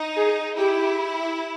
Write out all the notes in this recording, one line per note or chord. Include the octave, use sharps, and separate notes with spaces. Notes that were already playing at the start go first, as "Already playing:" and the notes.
Already playing: D#4
G#4
E4 G4